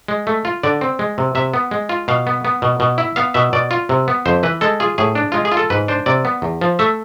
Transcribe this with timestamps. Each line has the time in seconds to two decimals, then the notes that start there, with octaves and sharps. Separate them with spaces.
0.08 G#3
0.27 A3
0.45 F4
0.63 D3 D5
0.81 C4
0.99 G#3
1.18 C3
1.35 C3 E5
1.54 B3
1.71 G#3
1.89 F4
2.08 B2 F5
2.27 B3
2.45 B3
2.62 B2
2.80 B2
2.98 E4
3.16 B3 F5
3.34 B2 E5
3.53 B2 D5
3.71 F4
3.89 C3
4.08 B3
4.26 F2 C5
4.43 E3 B4
4.61 G#3 A4
4.80 F4 G#4
4.98 A2 G#4
5.15 D4
5.32 G#3 F4
5.45 G#4
5.52 F4
5.57 A4
5.70 G#2 B4
5.88 D4 C5
6.06 C3 D5
6.25 B3
6.42 E2
6.61 F3
6.79 A3 E5